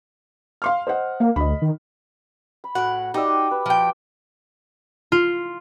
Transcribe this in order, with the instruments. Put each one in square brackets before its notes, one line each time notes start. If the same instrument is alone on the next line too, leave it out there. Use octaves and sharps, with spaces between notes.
[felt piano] F5 C6 F6
C5 D#5 F#5
[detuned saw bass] A#3 [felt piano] F5
[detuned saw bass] D2 [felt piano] D#5 B5
[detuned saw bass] D#3
[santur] B5
[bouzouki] A2 F#5 [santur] F#4
[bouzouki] D#4 [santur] G4 D5 E5
[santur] B4
[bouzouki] F3 G5
[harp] F4